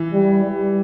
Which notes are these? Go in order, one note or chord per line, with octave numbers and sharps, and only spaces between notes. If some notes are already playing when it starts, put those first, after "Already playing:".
Already playing: E3
G3
G3